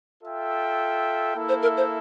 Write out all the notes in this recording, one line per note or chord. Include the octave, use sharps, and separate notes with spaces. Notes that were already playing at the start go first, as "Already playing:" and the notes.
F4 A4 E5 G5
A#3 E4 A4 E5
C5
A#4
C5